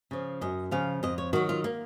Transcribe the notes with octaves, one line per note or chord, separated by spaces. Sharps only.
C#3 F3
F#2 D#5
C#3 F3 F5
F2 D#5
C#5
D#3 F#3 F#4
F4
A#3